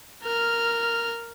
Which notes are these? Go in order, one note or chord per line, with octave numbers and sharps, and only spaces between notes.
A#4 F6